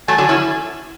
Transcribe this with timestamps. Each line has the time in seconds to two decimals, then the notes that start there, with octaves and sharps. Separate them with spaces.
0.08 F#3 A3 G#5
0.18 D3 F#3
0.29 C#4 E4